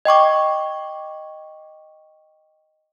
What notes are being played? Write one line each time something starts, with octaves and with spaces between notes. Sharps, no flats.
D#5 G5 C#6 D6